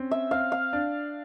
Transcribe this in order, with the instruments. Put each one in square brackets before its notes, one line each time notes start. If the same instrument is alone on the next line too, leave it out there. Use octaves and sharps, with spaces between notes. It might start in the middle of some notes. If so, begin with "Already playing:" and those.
Already playing: [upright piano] C4 C#4
[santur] E5
[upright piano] C4 [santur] F5
[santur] F5
[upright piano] D4